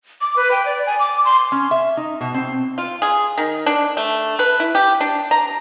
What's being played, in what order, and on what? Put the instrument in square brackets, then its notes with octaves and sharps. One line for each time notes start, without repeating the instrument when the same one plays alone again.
[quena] D6
B4
G5
D5
G#5
D6
C6
[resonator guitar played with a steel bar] C#4
E5
D#4
B2
C4
[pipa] F4
G#4
D#3
D4
A3
B4
E4
G4
D4
A#5